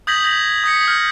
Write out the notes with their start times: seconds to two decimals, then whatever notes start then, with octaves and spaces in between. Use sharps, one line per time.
0.07 D#6 G6 G#6 A#6 B6 F#7
0.25 G#6 A#6 B6
0.64 D#6 G#6 A#6 B6 C#7
0.88 F6 G6